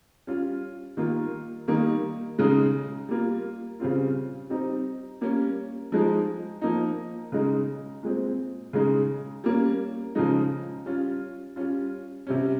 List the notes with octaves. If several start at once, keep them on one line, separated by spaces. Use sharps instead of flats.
G3 C#4 F4
D#3 G3 A#3 F4
D#3 G3 A#3 D#4
C#3 G#3 D#4
G3 A#3 F4
C#3 G3 C4 F4
G3 C4 D#4
G3 A#3 C#4
F3 G#3 D#4
F3 A#3 D#4
C#3 G#3 D#4
A#2 G#3 C4
C#3 G#3 D#4
G3 A#3 C#4
C#3 F3 G#3 D#4
G3 C#4 F4
G3 C#4 F4
C3 G3 C#4